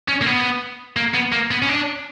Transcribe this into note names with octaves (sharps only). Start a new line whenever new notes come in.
C#4
A#3
B3
A#3
B3
A#3
B3
C#4
D4